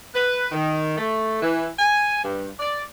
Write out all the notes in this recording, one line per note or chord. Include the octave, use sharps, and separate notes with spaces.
B4
D#3
A3
E3
G#5
G2
D5